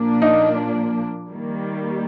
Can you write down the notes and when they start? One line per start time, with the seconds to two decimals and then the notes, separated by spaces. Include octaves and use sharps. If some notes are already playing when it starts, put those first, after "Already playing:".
Already playing: A#2 F3 A#3 D4
0.22 D#4
1.30 D#3 G3 A#3